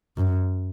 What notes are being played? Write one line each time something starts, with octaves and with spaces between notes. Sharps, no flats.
F#2